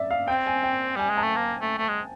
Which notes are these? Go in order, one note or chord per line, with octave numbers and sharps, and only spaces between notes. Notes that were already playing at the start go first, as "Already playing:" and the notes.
Already playing: D5 E5
F5
C4 G5
G#5
G5
G3 G#5
G#3
A5
A3
A#3
A3
A3
G#3